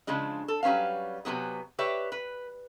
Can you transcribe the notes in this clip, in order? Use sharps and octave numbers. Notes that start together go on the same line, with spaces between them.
C#3 F3 G#3 D4
A4
F#3 G3 C#4 B4 F5
C3 E3 F#3 B3 G#4
G4 B4 C#5 D5 E5
B4